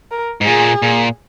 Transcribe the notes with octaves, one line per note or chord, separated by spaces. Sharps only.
A#4
G#2
A#2 G#4
A#2